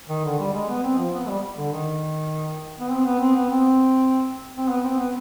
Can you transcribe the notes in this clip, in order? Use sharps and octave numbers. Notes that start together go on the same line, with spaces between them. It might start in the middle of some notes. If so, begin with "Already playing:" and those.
D#3
D3
G3
G#3
B3
C4
F3
B3
G3
D3
D#3
B3
C4
B3
C4
B3
C4
C4
B3
C4
B3